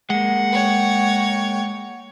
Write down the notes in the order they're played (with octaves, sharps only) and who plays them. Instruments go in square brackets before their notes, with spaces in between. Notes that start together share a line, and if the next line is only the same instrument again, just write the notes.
[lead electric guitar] G#3 A#3 [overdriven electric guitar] F#5
[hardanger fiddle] C#5 G5